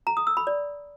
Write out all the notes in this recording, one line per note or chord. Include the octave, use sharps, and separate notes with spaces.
A#5
D#6
E6
B5
D5